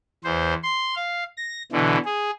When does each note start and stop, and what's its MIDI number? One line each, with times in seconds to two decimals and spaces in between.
0.24 0.54 40
0.24 0.54 72
0.63 0.95 84
0.95 1.23 77
1.37 1.63 94
1.72 1.98 47
1.72 1.98 50
1.72 1.98 52
2.05 2.30 68